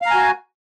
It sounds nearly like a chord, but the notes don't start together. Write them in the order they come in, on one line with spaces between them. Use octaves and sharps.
F5 A#5 G#5 F#4